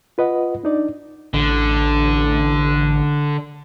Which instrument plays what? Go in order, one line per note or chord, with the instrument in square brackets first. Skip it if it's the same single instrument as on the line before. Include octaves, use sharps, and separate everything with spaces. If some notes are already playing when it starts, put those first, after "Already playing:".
[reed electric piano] F4 B4 D#5 F#5
D4 D#4 D5
[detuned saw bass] A1 [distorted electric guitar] D3